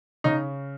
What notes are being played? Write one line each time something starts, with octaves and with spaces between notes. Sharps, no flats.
C#3 D#4